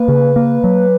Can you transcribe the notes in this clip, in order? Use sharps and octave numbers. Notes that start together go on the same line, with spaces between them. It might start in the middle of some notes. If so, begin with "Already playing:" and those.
Already playing: A#3 B4
C#3
A#3
F#3